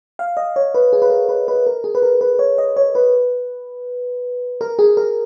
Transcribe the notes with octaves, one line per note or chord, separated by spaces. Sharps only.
F5
D#5
C#5
B4
G#4
B4
A#4
B4
B4
A#4
G#4
B4
A#4
B4
C#5
D#5
C#5
B4
A#4
G#4
A#4